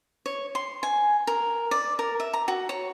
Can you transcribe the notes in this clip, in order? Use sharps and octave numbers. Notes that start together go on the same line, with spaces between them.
C#5
C6
G#5
A#4
D5
A#4
E5
A#5
F#4
C#5